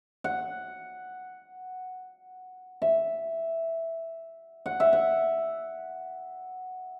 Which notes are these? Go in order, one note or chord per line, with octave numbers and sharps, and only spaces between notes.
F#5
E5
F#5
E5
F#5